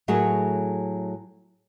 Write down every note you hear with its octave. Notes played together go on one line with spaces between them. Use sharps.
A2 F#3 A3 G#4 A#4 C#5